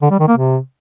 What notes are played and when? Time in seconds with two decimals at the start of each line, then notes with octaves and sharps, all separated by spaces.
0.02 D3
0.11 G3
0.19 D#3
0.28 A#3
0.37 C3